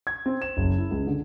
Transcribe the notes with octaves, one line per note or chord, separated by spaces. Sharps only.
G#6
C4
E7
F#1
E4
C#2
D3